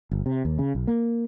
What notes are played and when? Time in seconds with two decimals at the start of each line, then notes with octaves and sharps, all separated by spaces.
0.11 G1
0.26 C3
0.45 D#2
0.59 C#3
0.75 B1
0.87 A#3